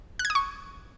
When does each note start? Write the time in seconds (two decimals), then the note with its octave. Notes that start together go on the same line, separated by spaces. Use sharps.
0.19 F#6
0.25 G#6
0.30 D#6
0.35 C#6